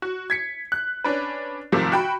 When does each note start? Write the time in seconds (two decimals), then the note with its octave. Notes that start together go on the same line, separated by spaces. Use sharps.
0.02 F#4
0.30 G#6 B6 C#7
0.72 F#6
1.04 C#4 D4 B4
1.72 G#2 C3 D#3 F3 G3 A3
1.92 F#4 G5 B5